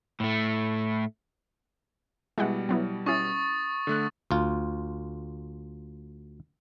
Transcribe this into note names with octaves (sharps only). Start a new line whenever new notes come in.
A2 A3
B2 G3 G#3 E4 F#5
F#3 B3 E4
C#4 E4 C#6 D#6 A6
D3 A3 F#6
D2 F4